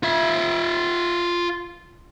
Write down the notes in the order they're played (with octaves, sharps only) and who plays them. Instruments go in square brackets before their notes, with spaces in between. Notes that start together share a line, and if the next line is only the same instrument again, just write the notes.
[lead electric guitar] F4 E5